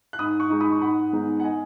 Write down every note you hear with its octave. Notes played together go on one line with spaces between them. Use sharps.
F#6
G#2 B5 D#6
C#6 F#6
G#3 D#4
B5 D#6
C#6
G#2 F#5 B5
G#3 B3 D#4
F#5
D#5 G#5